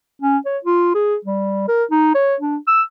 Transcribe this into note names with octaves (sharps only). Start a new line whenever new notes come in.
C#4
C#5
F4
G#4
G3
A#4
D#4
C#5
D4
E6